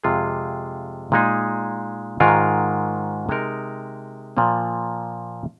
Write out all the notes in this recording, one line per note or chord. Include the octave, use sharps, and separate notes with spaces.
F2 C3 G#3 F4 G#4
A#2 G#3 D#4 G#4
G#2 D#3 G#3 F4 A#4
C3 G#3 D#4 A#4
A#2 F3 A#3